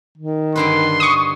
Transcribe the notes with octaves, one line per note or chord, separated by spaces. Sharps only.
D#3
G2 D3 B4 C6
C#6 D#6